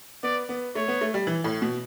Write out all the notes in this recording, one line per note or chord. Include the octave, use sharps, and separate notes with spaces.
B3 D5
B3
A3 C#5
B3
A3
G3
E3
A2
B2